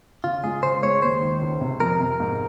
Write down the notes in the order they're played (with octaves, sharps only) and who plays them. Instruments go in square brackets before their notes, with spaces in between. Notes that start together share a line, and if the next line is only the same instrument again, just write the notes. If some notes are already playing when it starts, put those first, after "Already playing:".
[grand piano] C#3 [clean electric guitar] F4
[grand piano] G#3 [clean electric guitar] G#4
[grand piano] C#3 [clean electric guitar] C5
[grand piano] G#3 [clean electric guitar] C#5
[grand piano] D#2 [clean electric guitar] C5
[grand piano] D#3
C#2
C3
[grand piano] F2 [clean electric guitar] A#4
[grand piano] C3
G#2